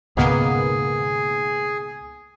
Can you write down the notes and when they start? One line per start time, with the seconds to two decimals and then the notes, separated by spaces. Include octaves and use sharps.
0.17 C#2 G#2 B2 D#3 A#3 B3 G#4